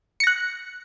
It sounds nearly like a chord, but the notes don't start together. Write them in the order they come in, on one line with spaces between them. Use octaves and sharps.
C#7 A#6 F#6